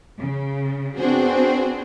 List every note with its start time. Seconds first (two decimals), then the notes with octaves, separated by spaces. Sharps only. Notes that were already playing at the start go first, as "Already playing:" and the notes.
0.20 C#3
0.97 B3 C4 D4 F#4 G#4 C5